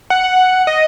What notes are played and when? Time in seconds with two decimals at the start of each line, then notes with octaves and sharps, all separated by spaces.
0.10 F#5
0.67 D#5